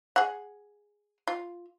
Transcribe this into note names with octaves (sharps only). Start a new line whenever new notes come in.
G#4 F#5
F4